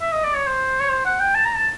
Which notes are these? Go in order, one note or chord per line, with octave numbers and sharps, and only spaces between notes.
E5
D#5
D5
C#5
C5
C#5
C5
F#5
G5
A5
A#5
A5